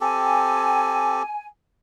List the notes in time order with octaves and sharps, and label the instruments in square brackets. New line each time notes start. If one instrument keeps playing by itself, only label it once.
[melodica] C4 G4 A4 [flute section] G#5